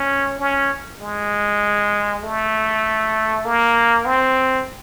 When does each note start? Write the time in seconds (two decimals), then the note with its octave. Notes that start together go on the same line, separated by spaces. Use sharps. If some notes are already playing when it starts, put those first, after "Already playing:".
Already playing: C#4
0.39 C#4
1.00 G#3
2.23 A3
3.45 A#3
4.05 C4